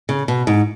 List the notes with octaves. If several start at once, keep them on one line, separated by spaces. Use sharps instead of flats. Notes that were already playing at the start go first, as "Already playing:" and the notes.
C#3
B2
G#2